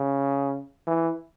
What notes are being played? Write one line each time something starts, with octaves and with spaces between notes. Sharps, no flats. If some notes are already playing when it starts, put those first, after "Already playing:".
Already playing: C#3
E3